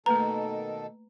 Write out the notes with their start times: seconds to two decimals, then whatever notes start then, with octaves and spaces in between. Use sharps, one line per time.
0.06 B2 D#3 A3 A#3 A4 B4 A#5